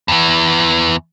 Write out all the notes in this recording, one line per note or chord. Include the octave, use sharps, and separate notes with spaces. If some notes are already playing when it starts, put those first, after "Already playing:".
E2 E3